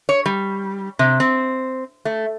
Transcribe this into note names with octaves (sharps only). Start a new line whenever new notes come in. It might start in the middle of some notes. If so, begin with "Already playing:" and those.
C#5
G3
C3
C4
A3